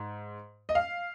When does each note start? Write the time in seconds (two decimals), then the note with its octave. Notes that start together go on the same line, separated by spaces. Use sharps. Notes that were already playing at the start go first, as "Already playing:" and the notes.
Already playing: G#2
0.69 D#5
0.75 F5